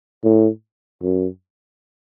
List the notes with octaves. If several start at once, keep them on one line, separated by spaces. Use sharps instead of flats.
A2
F#2